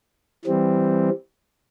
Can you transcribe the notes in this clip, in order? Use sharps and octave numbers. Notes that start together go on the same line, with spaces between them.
E3 G3 C4